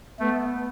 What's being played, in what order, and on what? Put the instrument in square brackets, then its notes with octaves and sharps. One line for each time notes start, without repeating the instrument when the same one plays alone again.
[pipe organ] A3 [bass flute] B3